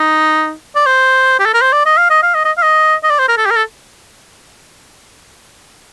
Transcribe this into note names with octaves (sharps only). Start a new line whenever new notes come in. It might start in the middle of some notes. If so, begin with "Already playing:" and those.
Already playing: D#4
D5
C5
G4
A4
A#4
C5
D5
D#5
F5
D#5
F5
D#5
D#5
F5
D#5
D#5
D5
C5
A#4
A4
G4
A#4
A4